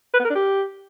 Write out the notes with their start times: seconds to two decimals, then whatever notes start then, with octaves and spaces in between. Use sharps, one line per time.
0.14 B4
0.19 B3
0.25 A#4
0.30 D4
0.35 G4